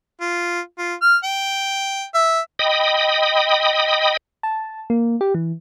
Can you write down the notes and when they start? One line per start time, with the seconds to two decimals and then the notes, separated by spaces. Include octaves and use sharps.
0.21 F4
0.78 F4
1.01 F6
1.24 G5
2.14 E5
2.59 D#5 G5 B5 D#6
4.43 A5
4.90 A#3
5.21 G4
5.34 E3